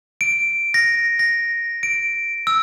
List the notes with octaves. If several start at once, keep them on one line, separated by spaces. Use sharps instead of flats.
D7
A#6
A#6
D7
E6